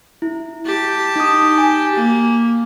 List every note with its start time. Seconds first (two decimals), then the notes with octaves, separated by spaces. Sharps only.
0.22 E4
0.66 G4 A5
1.16 D#4 D#6
1.58 G#5
1.95 A#3